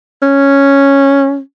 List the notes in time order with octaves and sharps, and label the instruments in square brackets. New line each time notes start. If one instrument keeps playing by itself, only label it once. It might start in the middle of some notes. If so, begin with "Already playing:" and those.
[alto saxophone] C#4